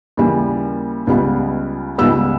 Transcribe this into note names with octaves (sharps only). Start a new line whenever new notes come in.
D#2 C#3 E3 G3
C#2 C#3 G3 B3
C#2 C#3 G3 B3 E6